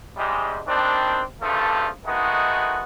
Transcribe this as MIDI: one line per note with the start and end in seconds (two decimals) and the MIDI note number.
0.17 0.59 44
0.17 0.59 48
0.17 0.59 55
0.17 0.59 56
0.66 1.19 51
0.66 1.19 55
0.66 1.19 60
0.66 1.19 62
1.42 1.86 32
1.42 1.86 38
1.42 1.86 43
1.42 1.86 53
1.42 1.86 57
1.42 1.86 69
2.05 2.83 51
2.05 2.83 56
2.05 2.83 57
2.05 2.83 59
2.05 2.83 63
2.05 2.83 66